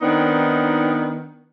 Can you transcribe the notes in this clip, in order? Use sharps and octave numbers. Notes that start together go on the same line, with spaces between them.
D#3 B3 C4 D4 D#4